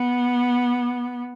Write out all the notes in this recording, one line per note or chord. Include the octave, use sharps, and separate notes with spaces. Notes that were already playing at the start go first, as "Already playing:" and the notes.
Already playing: B3